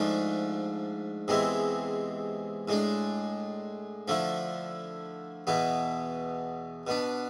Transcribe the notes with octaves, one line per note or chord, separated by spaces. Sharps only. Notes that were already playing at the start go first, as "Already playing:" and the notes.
Already playing: G#2 F3 A3 D4
E2 C3 G#3 C4 E4
A2 G#3 D4
D3 F3 A3 E4
E2 B2 B3 E4
B2 B3 D4